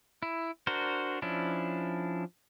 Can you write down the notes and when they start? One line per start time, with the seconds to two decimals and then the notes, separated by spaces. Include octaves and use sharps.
0.23 E4
0.67 D4 F#4 A#4 C5
1.22 F3 C#4 D4 E4